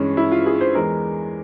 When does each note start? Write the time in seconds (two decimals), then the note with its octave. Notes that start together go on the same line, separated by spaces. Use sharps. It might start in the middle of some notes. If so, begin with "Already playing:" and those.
Already playing: G2 E3 G#3 C#4
0.17 E4
0.32 F4
0.46 G#4
0.61 C5
0.75 E2 E3 G#3 A#4